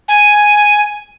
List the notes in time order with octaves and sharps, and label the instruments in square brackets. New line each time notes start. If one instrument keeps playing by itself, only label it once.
[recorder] G#5